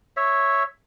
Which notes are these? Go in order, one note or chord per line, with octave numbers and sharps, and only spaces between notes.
C#5 E5